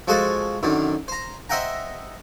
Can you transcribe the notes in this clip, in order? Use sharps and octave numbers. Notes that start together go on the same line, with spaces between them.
F3 G#3 F#4 G#4 A4
F#2 D3 D#3
C5 A#5
C5 D#5 E5 F#5 G5 A#5